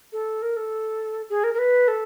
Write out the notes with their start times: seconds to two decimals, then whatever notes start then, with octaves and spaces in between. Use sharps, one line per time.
0.12 A4
0.42 A#4
0.57 A4
1.30 G#4
1.44 A#4
1.54 A#4
1.59 B4
1.88 A4